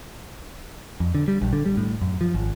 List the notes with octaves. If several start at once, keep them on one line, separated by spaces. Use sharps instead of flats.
F2
D3
G3
A#1
D3
G3
A2
F#2
F3
G#1